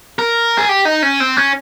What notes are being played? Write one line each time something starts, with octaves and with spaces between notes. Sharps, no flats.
A#4
G#4
G4
D#4
C#4
C4
C#4